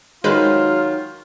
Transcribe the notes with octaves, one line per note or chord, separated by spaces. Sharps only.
D#3 F#3 G#3 F4 B4 C5